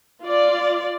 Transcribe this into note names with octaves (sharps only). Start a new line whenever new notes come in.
F4 D5